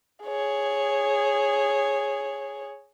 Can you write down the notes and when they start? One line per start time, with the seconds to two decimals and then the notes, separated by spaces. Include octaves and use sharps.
0.24 G#4 C#5